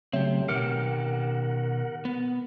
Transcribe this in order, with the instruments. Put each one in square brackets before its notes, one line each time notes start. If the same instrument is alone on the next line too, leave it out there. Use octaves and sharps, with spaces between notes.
[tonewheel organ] C#3 F#3 A3 [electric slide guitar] C4 G4
[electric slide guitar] B2 D#3 G4 [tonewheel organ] A#4 F#5
[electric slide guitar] B3